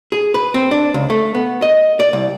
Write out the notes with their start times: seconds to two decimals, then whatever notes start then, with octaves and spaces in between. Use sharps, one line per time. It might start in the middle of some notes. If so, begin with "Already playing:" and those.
0.12 G#4
0.34 B4
0.54 C4
0.71 D4
0.94 C#2
1.10 A3
1.35 B3
1.62 D#5
2.00 D5
2.13 C2